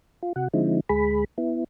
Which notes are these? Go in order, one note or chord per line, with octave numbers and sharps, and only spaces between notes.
F4
C3 F#4 F#5
D3 F3 G#3 C4 D#4 E4
D2 G#3 G#4 B5
B3 E4